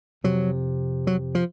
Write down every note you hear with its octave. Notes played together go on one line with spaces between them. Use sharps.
F2 C3 F#3
F#3
F3